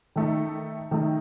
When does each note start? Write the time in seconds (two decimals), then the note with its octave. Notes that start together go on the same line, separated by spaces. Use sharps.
0.16 D#3 A3 D#4
0.91 D#3 A3 D#4